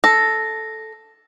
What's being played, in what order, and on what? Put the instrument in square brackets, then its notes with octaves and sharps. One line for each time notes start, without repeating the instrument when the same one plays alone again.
[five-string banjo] A4 [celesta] A#6